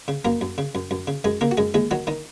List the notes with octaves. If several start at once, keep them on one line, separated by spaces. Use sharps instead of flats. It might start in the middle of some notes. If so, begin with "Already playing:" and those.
C#3
F#2 A#3 A#4
F#2
C#3
F#2
F#2
C#3
F#2 G#3 G#4
C#3 A#3 A#4
F#4
F#2 G#3 G#4
D#2 G#3 G#4
D#3 F#3 F#4
D#3 D#4